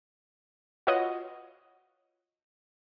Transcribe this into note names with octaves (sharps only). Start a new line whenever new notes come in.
F4 F#4 B4 C#5 D#5 F#5